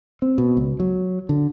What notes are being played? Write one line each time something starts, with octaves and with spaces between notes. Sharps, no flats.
C4
B2
C#2
F#3
D3